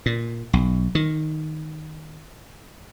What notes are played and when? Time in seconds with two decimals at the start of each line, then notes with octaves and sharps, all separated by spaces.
0.06 A#2
0.53 B1
0.95 D#3